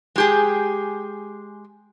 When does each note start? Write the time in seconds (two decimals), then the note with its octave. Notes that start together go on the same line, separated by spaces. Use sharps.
0.16 G#3 G4 G#4